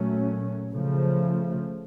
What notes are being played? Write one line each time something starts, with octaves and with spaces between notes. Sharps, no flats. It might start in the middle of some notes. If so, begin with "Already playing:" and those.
Already playing: A#2 F#3 A3 C#4
C#3 F3 A3